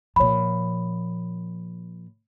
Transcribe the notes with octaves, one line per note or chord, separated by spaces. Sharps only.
A#2 F3 C#5 B5